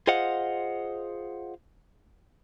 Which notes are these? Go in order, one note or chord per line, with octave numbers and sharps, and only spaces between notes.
F4 G#4 C5 D#5 F5 F#5